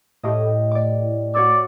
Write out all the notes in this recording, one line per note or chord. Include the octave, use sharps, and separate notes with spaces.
A2 G4 D#5
D5 D6
F#4 C#5 D5 E6